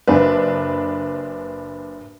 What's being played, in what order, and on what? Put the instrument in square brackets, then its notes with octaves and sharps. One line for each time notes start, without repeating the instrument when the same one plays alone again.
[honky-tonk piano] F#1 D4 B4